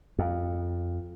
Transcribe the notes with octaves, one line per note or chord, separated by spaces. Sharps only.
F2